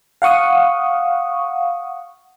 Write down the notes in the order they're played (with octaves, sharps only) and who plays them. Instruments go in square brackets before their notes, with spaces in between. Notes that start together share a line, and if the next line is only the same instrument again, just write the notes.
[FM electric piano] F5 F#5 C#6 D#6